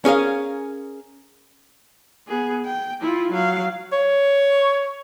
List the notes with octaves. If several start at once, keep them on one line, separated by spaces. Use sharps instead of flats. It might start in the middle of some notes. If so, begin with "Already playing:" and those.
C#4 G#4 A#4 F5
B3 G#4
G5
E4 F4
F#3 F5
C#5